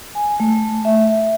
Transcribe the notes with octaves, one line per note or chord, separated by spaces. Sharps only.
G#5
A3
E5
E5